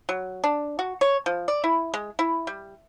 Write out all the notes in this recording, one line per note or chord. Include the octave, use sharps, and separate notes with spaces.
F#3
D4
F#4
C#5
F3
D5
E4
G#3
E4
G3